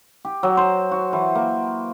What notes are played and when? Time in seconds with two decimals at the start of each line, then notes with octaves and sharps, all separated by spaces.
0.25 G4
0.43 F#3
0.57 C5
0.91 F#4
1.13 E3
1.35 A#3